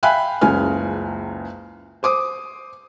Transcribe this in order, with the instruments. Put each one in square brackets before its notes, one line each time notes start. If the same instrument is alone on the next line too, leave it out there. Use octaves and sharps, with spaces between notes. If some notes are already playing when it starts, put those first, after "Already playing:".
[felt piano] E5 F5 G5 G#5 B5 F#6
F#1 C#2 C#3 G#5 F6
C5 D6 D#6